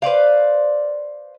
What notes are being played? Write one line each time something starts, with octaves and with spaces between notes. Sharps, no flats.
B4 C5 D5 F5